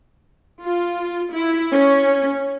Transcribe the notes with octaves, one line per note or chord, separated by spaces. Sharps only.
F4
E4
C#4